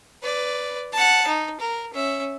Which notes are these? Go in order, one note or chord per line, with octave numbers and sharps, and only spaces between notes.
B4 D5
F#5 A5
D#4
A#4
C#4 E5